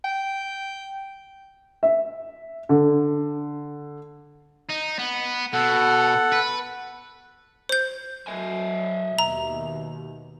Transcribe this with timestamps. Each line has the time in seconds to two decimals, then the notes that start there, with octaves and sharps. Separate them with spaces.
0.05 G5
1.83 E5
2.69 D3
4.70 D#4
4.99 B3
5.53 B2 A4 F#5
6.32 B4
7.69 C5 G6
8.27 F#3 D#5 E5 G#5
9.19 D#2 B2 A#5